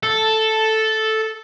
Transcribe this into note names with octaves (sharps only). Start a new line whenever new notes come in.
A4